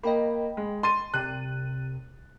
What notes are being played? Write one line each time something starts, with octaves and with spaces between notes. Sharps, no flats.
A#3 D#5 G5 B5
G#3
C6 A6 D#7
C2 C3 F#6 D#7